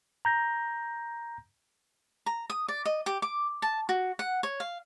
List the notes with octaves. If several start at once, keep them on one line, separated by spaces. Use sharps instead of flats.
A#5 G6 A#6
A#5
D#6
D5
D#5
G4
D6
A5
F#4
F#5
C#5
F5